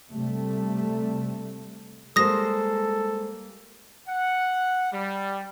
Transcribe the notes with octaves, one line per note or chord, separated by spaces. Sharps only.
C3 G3 A3
G3 G#3 A#3 A4 C5 D#6 A#6
F#5
G3